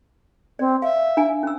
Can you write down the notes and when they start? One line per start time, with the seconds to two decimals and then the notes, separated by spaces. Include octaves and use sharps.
0.59 C4 D5
0.82 E5 F5
1.17 D4 G#5
1.43 C#4 E6